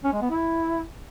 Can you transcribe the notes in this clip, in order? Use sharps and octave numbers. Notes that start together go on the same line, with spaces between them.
C#4
G#3
B3
E4